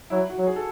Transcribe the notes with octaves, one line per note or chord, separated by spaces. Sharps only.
F#3 E4
F#4
F#3
G#4
A4